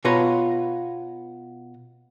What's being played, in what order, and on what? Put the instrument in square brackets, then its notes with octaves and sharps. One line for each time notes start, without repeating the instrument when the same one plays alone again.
[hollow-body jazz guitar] B2 F4 B4 C#5 A#5